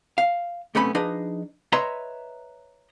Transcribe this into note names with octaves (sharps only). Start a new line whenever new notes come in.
F5
B1 C3 A3 B3 C#4 B5
F3 D4 D#4 G#4 B4 D#5
B4 C#5 D#5 E5 A#5 C6